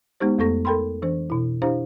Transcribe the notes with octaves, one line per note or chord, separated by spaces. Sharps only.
G#3 B3 D#4 G4 C5
F2 A3 B3 A4 C#6 A#6
A4 A#4 G5 B5 C6
E3 D4 C5
B2 E4
D4 E4 G4 C5 F5 A#5